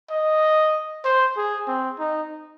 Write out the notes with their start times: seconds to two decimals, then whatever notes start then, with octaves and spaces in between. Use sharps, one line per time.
0.11 D#5
1.05 C5
1.37 G#4
1.68 C4
1.99 D#4